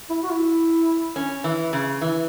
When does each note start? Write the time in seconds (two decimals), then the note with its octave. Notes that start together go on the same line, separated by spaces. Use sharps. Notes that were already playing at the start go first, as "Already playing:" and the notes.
0.09 E4
0.23 F#4
0.30 E4
1.16 C#4
1.44 E3
1.73 C#3
2.01 E3